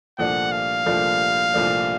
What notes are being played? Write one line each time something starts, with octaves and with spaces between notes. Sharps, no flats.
C2 A#2 F3 A3 D4 F#5
F5
C2 A#2 F3 A3 D4
C2 A#2 F3 A3 D4